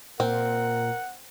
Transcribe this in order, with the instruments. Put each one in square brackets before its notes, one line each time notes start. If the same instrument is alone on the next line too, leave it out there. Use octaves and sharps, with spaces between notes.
[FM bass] A#2 [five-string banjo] C4 [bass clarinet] A#4 [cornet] F#5